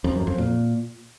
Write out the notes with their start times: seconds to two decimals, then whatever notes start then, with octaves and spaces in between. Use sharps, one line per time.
0.04 F2
0.16 F#2
0.27 F2
0.38 A#2